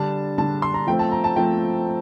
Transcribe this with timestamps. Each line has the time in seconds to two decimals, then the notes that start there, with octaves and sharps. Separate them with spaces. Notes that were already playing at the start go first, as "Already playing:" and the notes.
Already playing: D3 G3 D4 A5
0.38 D3 G3 D4 A5
0.62 C6
0.74 A#5
0.87 F3 A3 C4 G5
0.99 A5
1.12 A#5
1.24 A5
1.36 F3 A3 C4 G5